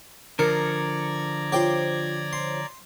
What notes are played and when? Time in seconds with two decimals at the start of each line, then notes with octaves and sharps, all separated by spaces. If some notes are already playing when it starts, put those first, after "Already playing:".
0.39 D3 F3 A#4 D5 A#5 G#6 C#7
1.52 F4 G4 C5 C#5 G5
2.33 C6